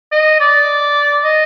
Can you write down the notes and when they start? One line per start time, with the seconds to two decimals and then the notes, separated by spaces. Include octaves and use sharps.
0.12 D#5
0.40 D5
1.24 D#5